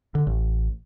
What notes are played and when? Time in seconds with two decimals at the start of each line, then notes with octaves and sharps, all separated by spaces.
0.15 D3
0.27 A1